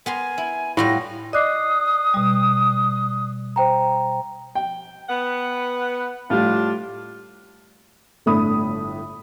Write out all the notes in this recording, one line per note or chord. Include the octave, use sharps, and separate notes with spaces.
B3 A#4 G#5 C6
E4
A2 G3 F4 F#4 A#6
D5 D#5 D6 D#6 F#6 C7
B2 G3
C5 G5 A#5
G5
B3 F#5
A2 G3 D4 F4
G1 A2 A3 D4 B5 D#6